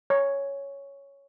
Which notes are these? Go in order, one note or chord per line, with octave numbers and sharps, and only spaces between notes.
C#5